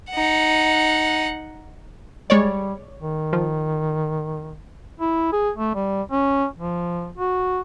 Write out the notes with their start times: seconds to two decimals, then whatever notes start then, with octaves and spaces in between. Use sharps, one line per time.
0.11 D#4 F#5
2.30 G3 G#3 C#5 D5
3.02 D#3
3.33 F3
5.00 E4
5.32 G#4
5.56 A3
5.75 G3
6.11 C#4
6.59 F3
7.18 F#4